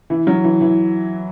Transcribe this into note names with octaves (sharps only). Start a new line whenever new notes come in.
E3
F#3
E3
E3